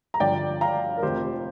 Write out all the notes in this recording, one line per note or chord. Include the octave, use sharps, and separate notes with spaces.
A#5
G1 G2 D3 F3 D5 G5
F5 A#5
A#4
F1 F2 F3 G4 C5